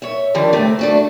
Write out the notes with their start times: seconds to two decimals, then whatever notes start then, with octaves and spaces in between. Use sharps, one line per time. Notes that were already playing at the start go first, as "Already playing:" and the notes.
0.02 C#5 E5
0.35 F2 D3 D#3 G3
0.53 C3 A3
0.79 A3 D4 F#4